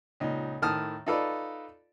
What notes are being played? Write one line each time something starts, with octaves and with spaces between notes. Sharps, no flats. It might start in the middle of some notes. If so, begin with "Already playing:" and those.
C#2 A#2 D#4
A2 D#3 A5 D#6 F6
D#4 F4 A4 B4 D5